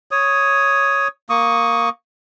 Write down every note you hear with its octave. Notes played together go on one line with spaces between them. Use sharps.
C#5 D#6
A#3 C#6 D#6